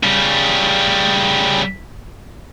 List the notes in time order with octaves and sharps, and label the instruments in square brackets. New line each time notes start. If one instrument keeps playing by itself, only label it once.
[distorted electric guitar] C#3 G3